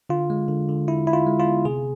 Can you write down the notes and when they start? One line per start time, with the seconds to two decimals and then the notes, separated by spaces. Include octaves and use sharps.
0.09 D3 F4
0.30 G#3
0.48 D3
0.69 D3
0.88 D3 E4
1.07 D3 E4
1.13 F4
1.26 G#3
1.39 F4
1.47 B3
1.65 C3 G#4